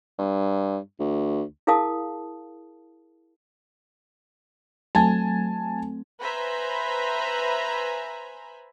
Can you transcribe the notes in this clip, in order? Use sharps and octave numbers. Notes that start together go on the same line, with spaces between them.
G2
D2
E4 G#4 A#4 F5 A5 D#6
F#3 A3 C4 G#5 A5
B4 C5 E5 G#5 A#5 B5